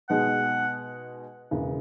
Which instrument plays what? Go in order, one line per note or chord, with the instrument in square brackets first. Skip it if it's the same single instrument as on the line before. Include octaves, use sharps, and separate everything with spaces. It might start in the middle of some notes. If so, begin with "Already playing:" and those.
[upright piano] B2 G#3 D#4 [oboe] F#5
[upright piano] E1 E2 C#3